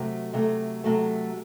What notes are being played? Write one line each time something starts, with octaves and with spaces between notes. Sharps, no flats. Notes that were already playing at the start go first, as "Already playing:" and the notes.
Already playing: C3 F#3 A3
C3 F#3 A3
C3 F#3 A3